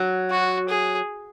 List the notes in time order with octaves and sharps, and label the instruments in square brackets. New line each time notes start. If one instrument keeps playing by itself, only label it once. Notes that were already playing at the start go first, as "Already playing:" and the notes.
Already playing: [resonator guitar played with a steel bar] F#3
[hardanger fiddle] F#4
G#4